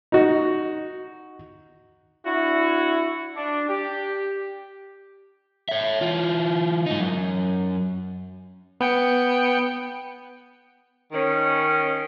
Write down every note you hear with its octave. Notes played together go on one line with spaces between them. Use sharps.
D#4 F#4
D4 E4 F#4
D4
G4
C#5 E5
E3 F4
G#2 D#4
F#2
B3 G5 C#7
D#3 C#4